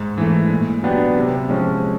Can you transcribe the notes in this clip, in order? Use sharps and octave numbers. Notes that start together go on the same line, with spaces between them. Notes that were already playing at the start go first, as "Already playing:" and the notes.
Already playing: G#2
E3 A3
A#2
F#3 B3 D4 G4
C3
F3 G#3 C#4